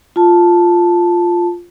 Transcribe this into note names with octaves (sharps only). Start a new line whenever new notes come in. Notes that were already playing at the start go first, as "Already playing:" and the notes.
F4 A5